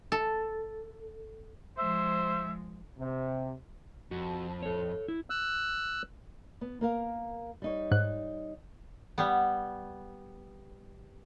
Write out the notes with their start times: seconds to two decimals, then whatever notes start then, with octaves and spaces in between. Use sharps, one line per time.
0.12 A4
1.77 F3 G#3 C5 E5
2.98 C3
4.11 F2 F#4
4.63 A4 C#5
5.08 E4
5.30 E6 F#6
6.61 B3
6.81 A#3 A#4 F5
7.62 G3 D#4 C#5
7.91 G#2 F#6
9.18 G3 B3